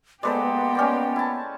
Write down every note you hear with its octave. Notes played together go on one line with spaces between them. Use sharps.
G#3 A#3 B3 G4 A4 B4 C5 D5
C#4 D5 G5
E4 A5